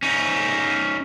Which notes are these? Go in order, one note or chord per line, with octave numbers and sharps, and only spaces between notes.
C#4 D#4